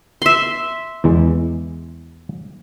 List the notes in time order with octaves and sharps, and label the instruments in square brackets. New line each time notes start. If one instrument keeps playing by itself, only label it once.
[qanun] E5 C6
[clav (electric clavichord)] E2 E3 G#3